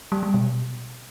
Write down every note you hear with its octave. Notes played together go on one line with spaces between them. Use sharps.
G3
G3
B2